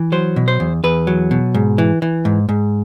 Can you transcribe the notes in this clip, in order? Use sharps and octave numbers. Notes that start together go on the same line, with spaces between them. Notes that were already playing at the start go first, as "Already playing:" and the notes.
Already playing: E3
F#3 C5
B2
C5
E2
E2 B4
F#3
B2
G#2
E3
E3
G#2
G#2